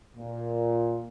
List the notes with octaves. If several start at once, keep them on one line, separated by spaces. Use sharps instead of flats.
A#2